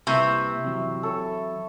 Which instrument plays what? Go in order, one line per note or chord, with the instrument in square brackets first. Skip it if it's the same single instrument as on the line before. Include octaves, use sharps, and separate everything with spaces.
[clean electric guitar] C2 A#3 B4 [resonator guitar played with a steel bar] C3 [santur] E4 C#6 E6
[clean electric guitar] E3 F#3 C4
[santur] A4 C#5